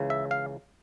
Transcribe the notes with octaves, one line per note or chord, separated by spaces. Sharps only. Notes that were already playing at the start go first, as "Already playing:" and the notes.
Already playing: C#2 C#3 E3
E5
F5